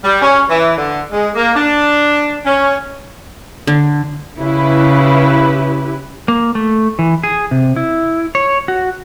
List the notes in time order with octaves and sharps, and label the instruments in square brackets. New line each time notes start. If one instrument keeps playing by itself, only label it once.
[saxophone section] G3
C#4
E3
D3
G#3
A#3
D4
C#4
[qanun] D3
[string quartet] C#3 [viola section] E4 G4 B4
[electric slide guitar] A#3
A3
E3
G#4
C3
E4
C#5
F#4